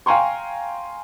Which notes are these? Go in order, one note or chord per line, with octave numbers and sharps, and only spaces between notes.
F5 G5 G#5 A#5 C6 C#6